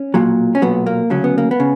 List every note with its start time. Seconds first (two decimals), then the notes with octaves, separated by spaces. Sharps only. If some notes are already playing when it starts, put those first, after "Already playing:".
Already playing: C#4
0.14 B1 A#2 F#3
0.55 C#4
0.62 B1 A#2 F#3 B3
0.86 A#3
1.10 D2 C#3 F#3 C#4
1.24 B3
1.38 A#3
1.51 B3
1.60 C#3